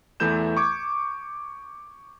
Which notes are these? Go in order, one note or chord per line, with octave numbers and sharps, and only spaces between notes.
E2 E3 A3 E4 G6 E7
C#6 D6 G#6